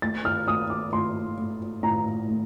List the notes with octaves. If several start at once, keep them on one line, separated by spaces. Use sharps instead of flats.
A3 A6
F6
A3 D#6
D6
A3 C6
A3
A2 A#5
A3